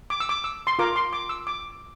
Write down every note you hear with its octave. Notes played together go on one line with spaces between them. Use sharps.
D6
E6
D6
E6
C6
F4 A#4 D6
C6
D6
E6
D6